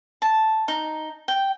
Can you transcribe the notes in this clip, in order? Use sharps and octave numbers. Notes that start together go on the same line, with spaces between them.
A5
D#4
G5